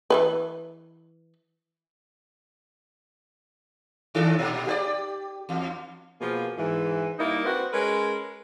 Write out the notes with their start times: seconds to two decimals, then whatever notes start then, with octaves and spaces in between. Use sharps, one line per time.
0.10 E3 F#3 B4
4.15 D#3 D4 A4
4.39 A#2
4.67 G4 A#4 D5
5.49 E2
6.21 B2 F3 A#3 G#4
6.58 G#2 E3
7.19 G3 A#3 D#4 E4
7.45 C4 F#4 B4 C5
7.73 G#3 C#4 A#4 B4